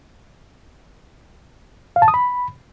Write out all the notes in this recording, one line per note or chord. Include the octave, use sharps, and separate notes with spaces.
F5
A5
D#6
B5